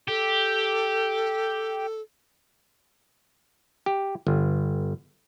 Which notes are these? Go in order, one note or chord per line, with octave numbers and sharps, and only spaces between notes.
G4 A4
G4
G1